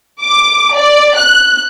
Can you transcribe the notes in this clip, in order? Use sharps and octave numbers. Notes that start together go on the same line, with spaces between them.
D6
D5
F#6